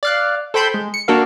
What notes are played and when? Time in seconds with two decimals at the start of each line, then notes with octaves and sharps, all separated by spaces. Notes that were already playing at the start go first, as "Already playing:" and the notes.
0.03 D5 F5 F#6
0.54 A4 C5 G5 B5 C6 G6
0.74 G#3
0.94 C#7
1.08 A#3 D4 F#4 A4 A#4 F5